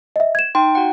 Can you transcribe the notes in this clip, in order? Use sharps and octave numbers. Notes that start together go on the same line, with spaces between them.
D#5 E5
G#6 E7
D#4 G5 C6
F#4 F#5